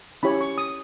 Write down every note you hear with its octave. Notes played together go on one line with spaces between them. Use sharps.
C#4 E4 G4 C#5 B5
C#6
D#6